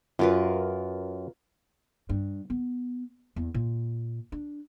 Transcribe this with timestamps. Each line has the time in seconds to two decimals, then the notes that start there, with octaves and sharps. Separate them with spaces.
0.19 F#2 F4 A#4 B4
2.09 G2
2.50 B3
3.36 E2
3.54 A#2
4.32 D4